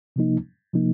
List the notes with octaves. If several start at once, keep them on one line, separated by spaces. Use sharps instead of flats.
C3 F3 A#3 D#4
C3 F3 A#3 D#4